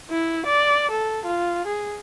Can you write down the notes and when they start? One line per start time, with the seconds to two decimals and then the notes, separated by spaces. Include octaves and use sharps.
0.10 E4
0.45 D5
0.91 A4
1.26 F4
1.66 G#4